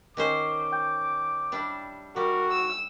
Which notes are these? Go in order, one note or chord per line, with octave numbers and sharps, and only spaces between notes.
D#3 C#4 C5 D6
G5 G6
G3 D4 E4
G3 F#4 A#4
E6